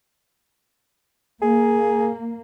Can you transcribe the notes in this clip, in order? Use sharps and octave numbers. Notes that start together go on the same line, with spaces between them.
A#3 G#4